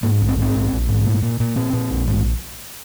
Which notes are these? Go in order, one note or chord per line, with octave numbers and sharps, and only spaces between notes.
G#2 A#3
A#1
C4
G#2
C4
A#1
A#1
G#2
A#2
A#2
A#2
A#2 C4
A#2
A#1
G#2